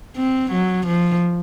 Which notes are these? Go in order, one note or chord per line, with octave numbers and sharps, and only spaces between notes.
C4
F#3
F3